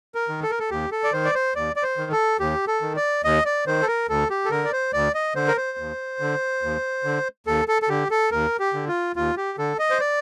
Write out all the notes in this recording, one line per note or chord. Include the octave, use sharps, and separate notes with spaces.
A#4
D#3
A4
A#4
A4
D#2 G4
A4
D5
D#3 C5
D5
C5
D#2 D5
D5
C5
D#3
A4
D#2 G4
A4
D#3
D5
D#2 D#5
D5
D#3 C5
A4
A#4
D2 A4
G4
A4
D3 A#4
D5
C5
D2 D5
D#5
D3 C5
A#4
C5
D#2
D3
D#2
D3
D#2 A4
A4
A4
D3 G4
A4
D#2 A#4
G4
D3
F4
D#2 F4
G4
D3 A4
D#5
C5
D5